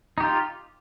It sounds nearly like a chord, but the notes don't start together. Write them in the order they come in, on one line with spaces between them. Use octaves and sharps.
D#4 G4 F4